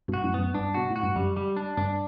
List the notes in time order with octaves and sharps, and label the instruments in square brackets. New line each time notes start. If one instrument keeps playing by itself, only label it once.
[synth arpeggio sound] G2 B2
[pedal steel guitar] F#4
[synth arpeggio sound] F#2 A2
[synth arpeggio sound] F#2 [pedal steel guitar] B3
[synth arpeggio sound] G2 [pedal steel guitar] D4
[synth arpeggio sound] B2 [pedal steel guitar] F#4
[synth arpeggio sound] A2
[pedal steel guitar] F#4
[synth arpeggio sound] G2
[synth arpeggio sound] F#2 [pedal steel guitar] G3
[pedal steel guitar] G3
D4
[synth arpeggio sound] G2 [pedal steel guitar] D4